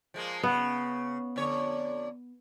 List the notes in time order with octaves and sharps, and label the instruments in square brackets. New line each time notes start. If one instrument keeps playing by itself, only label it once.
[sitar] F3 G#3 A#3
[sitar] C#3 [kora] B3
[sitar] F2 D3 C#5